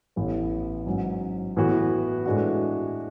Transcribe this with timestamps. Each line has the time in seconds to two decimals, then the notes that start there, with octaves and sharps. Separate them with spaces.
0.16 A1 A2 E3 B3 E4
0.87 G#2 F#3 C#4
1.57 A2 E3 B3 F#4 B4
2.26 A2 G#3 D4 F#4